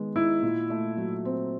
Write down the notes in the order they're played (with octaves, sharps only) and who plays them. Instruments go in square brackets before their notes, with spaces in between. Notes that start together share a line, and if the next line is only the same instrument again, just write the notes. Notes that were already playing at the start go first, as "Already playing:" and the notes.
Already playing: [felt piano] D#3 G#3 B3
[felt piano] D#4 [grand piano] E4
[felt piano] A#2
A3
F#3
C4